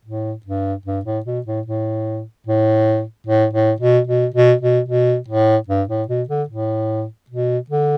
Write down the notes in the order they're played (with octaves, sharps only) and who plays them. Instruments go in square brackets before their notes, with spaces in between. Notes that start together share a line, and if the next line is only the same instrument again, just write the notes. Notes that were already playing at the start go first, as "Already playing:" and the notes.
[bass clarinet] A2
G2
G2
A2
B2
A2
A2
A2
A2
A2
B2
B2
B2
B2
B2
A2
G2
A2
B2
D3
A2
B2
D3